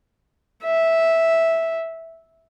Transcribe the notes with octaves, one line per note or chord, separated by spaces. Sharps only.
E5